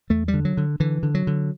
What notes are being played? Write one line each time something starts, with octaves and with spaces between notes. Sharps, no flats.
E2 A3
G3
D3
F#3
D3
D3 E3
D3
F#3
D3